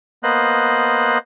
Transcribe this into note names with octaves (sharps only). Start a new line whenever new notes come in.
A#3 B3 C5 D#5 F#6